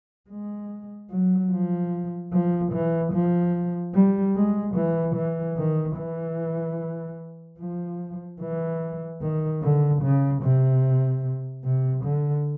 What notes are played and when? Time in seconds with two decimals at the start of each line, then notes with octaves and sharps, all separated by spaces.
0.30 G#3
1.10 F#3
1.51 F3
2.33 F3
2.72 E3
3.13 F3
3.94 G3
4.35 G#3
4.75 E3
5.15 E3
5.57 D#3
5.96 E3
7.59 F3
8.41 E3
9.21 D#3
9.62 D3
10.02 C#3
10.42 C3
11.65 C3
12.05 D3